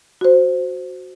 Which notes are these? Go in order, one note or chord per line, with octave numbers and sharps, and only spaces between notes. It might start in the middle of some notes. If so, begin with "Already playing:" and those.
F#4 C5